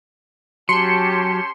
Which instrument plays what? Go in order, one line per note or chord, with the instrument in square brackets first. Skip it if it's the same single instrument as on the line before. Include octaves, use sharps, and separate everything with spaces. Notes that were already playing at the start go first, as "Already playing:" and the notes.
[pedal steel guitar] F#3 [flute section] C#4 G4 A5 [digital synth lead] C6 [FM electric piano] C#7